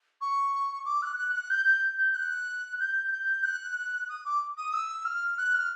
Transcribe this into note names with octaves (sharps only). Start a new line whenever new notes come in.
C#6
D6
F#6
F#6
F#6
G6
G6
G6
F#6
G6
G6
F#6
D#6
D6
D#6
E6
F6
F#6
F6